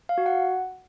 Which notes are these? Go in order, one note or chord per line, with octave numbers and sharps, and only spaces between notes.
F5
F#4
F#5